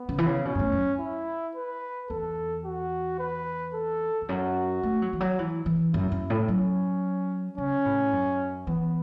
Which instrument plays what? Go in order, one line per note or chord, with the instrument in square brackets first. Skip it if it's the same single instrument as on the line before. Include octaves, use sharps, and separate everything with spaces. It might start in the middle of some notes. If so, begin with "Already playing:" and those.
Already playing: [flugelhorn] B3
[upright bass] C#3
E3
C#3
[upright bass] B2 [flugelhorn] C#4
[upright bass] F#2
A2
F#2
[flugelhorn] E4
B4
[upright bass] E2 [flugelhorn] A4
[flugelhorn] F#4
B4
A4
[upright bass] E2
[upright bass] F#2 [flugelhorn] F#4
[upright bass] A3
F#3
E3
F#3
E3
E3
[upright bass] F#2 [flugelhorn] E4
[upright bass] F#2
A2
[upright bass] F#3 [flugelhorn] C#4
[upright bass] C#3 [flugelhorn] C#4
[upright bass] A2
F#2
[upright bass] E3 [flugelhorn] B3